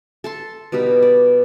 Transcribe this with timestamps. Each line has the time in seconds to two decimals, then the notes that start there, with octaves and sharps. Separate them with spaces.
0.24 A4 A5 C6
0.72 B2 G3 D#4 B4
1.02 D5